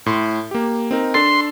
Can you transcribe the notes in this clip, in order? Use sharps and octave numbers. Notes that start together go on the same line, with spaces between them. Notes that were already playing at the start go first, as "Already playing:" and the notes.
A2 C6
A#3 G4
C4 D#4 A#4
D4 A4 C6 A6